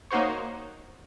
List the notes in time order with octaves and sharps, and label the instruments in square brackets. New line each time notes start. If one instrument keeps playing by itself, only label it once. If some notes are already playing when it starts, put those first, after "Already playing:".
[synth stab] A#3 D#4 F#4 C5 C#5